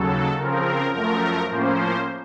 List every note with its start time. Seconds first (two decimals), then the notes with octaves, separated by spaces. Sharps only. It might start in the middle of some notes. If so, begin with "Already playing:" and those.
Already playing: D#2 C#3 F#3 A4
0.38 C#3 F3 C4 A#4
0.93 F#2 F3 A3 A#4
1.48 A2 F3 A#3 C#4 C5